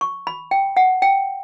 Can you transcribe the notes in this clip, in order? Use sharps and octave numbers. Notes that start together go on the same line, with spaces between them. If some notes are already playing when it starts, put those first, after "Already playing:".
C#6
B5
G5
F#5
G5